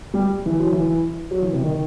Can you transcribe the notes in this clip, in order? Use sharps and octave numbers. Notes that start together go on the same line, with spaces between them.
G3
E3
F#3
E3
F#3
E3
C3
D#3